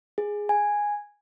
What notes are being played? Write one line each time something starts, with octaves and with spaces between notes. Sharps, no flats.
G#4
G#5